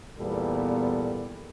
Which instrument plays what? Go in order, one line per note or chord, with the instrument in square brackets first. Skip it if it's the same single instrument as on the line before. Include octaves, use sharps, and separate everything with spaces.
[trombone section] E2 A#2 G3 B3 A4